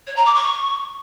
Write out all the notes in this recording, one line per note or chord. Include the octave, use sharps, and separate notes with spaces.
C#5
A#5
D6
C#6